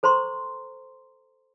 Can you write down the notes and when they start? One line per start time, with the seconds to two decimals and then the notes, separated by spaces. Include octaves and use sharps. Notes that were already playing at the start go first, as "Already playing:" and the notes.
0.03 A4 C5 A#5 C6 C#6